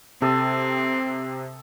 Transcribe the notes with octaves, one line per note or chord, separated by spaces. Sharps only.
C3 C4 A4 D#6